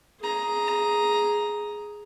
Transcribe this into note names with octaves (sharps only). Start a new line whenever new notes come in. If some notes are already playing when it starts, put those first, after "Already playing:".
G#4 A#5